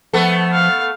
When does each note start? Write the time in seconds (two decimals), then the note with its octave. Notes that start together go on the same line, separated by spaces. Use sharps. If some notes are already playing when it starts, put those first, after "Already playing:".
0.13 F3 A3 B3 A4
0.52 F5